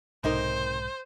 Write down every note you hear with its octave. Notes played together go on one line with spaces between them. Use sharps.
B1 G#2 C3 D#4 A#4 C5